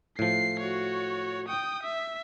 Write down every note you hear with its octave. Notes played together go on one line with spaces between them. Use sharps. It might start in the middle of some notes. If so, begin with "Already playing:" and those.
A2 F3 C7
F#4 C#5
G5 D#6
E5